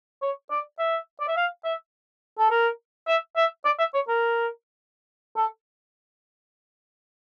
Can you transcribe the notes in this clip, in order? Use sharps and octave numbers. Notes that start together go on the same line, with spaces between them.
C#5
D5
E5
D5
E5
F5
E5
A4
A#4
E5
E5
D5
E5
C#5
A#4
A4